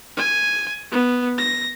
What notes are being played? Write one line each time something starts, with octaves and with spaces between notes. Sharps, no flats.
G#5
B3
A#6